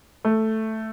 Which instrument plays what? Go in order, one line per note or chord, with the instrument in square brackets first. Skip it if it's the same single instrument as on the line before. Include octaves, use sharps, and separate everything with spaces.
[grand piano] A3